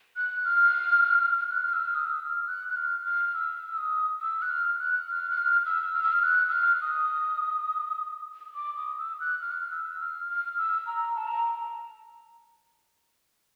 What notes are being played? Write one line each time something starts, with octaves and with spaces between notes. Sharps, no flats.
F#6
F6
F#6
F6
E6
F6
D#6
E6
F6
F#6
F#6
F6
F6
E6
E6
D#6
E6
F#6
F6
F#6
F6
F#6
F6
E6
F6
E6
F6
F#6
E6
F6
D#6
D6
D#6
E6
F#6
F6
F#6
F6
E6
F6
F6
E6
A#5
A5
A#5